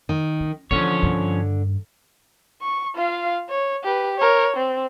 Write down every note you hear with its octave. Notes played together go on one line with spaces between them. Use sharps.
D#3
C#4
D3 E3 F3 C4 C#4 C#5
G2 D#3
C#6
F4 F5
C#5
G4 B4
A#4 C#5
C4